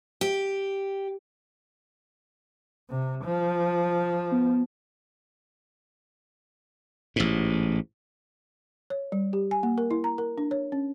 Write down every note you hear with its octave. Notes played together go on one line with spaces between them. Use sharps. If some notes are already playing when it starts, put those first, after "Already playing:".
G4
C3
F3
B3
A1 G#2
C#5
G3
G4
G#5
A#3
A#4
E4
A#5
A#4
D4
C#5
C#4